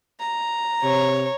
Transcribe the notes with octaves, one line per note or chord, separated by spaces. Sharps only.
A#5
C3 C#5